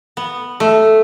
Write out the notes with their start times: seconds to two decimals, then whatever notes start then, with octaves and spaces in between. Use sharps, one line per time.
0.17 B3
0.60 A3